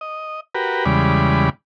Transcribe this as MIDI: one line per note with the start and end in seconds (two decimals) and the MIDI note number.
0.01 0.40 75
0.55 0.85 66
0.55 0.85 67
0.55 0.85 70
0.55 0.85 71
0.85 1.49 40
0.85 1.49 49
0.85 1.49 55
0.85 1.49 56
0.85 1.49 74
0.85 1.49 83